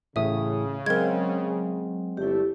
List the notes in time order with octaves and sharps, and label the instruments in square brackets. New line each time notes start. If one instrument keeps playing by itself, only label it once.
[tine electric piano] A1 A2 D#6 [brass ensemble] C#3 [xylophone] E5
[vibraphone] F#3 [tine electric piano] G#3 C4 [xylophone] A#4 G#6
[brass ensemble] G1 A3 D5 [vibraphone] E4 G4